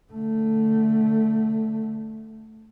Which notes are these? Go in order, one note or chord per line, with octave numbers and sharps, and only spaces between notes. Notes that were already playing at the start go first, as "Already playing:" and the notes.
D3 A3